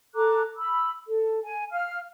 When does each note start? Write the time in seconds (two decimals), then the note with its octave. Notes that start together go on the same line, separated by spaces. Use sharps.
0.14 A4 A#5 D6 F#6
0.56 B5 E6
1.07 A4
1.45 G#5
1.72 F5 F6